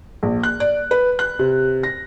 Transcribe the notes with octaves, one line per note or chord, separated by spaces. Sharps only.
A#1
F#6
D5
B4
F#6
C3
A#6